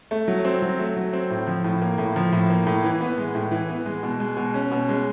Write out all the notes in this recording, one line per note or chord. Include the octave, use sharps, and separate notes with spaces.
A3
F#3
C4
F#3
A3
F#3
C4
A2
F3
A2
A#3
A2
F3
A2
A#3
A2
E3
B3
G#3
A2
E3
B3
G#3
B2
G#3
B2
C#4
B2
G#3